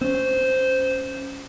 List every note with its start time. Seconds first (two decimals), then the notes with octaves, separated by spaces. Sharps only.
0.01 C4 C#4 C5